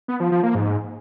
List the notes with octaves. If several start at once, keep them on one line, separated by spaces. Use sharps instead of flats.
B3
F3
F3
A#3
G#2